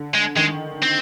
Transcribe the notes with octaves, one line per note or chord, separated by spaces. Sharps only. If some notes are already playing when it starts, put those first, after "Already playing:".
Already playing: D3
G#3
D#3 G#3
C4